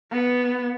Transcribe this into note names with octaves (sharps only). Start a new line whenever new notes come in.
B3